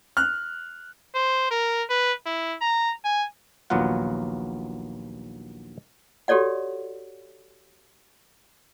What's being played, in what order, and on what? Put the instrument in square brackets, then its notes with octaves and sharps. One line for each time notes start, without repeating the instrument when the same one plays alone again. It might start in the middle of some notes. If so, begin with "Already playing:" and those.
[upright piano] F6 F#6
[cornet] C5
A#4
B4
E4
A#5
G#5
[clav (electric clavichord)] A#1 D#2 F#3 B3 F4 F#5
[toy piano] F#4 G4 A4 C#5 D5 F#5